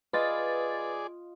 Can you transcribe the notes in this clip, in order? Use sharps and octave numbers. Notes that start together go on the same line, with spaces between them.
F4 G#4 B4 D5 D#5 A6